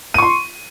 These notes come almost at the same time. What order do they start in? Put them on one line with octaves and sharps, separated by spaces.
D#7 C#6 C6